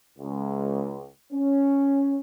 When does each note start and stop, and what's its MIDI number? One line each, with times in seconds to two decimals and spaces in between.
0.18 1.09 37
1.33 2.21 61